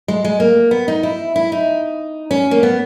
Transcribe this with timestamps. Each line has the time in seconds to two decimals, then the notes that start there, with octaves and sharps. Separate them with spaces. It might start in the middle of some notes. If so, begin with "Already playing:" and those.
0.08 G#3
0.25 G#3
0.40 A#3
0.71 B3
0.88 D#4
1.03 E4
1.36 E4
1.52 D#4
2.31 C#4
2.51 A#3
2.63 B3